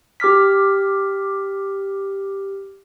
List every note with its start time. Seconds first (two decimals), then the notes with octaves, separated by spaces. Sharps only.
0.20 G4 D6 F6 B6